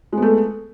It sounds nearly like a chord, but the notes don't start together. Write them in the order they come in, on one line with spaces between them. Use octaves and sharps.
G#3 B3 A3